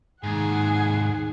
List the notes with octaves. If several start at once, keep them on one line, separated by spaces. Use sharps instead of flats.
D#2 G#2 D#4 G#4 F#5